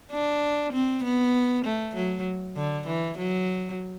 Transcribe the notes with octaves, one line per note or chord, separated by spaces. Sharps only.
D4
C4
B3
A3
F#3
D3
E3
F#3